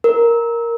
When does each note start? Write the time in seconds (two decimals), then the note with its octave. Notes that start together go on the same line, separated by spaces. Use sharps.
0.04 A#4